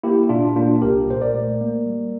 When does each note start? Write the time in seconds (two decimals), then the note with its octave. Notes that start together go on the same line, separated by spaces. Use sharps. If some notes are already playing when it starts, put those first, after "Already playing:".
0.03 A#3 E4 G4
0.29 A#2 D4 F4
0.56 A#3 D4 F4
0.82 C2 G4 A#4
1.08 A#2 C5
1.21 A#4 D5
1.34 A3
1.61 A#3
1.86 G3